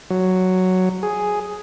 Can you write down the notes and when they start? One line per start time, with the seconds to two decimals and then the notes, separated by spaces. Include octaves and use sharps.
0.10 F#3
1.03 G#4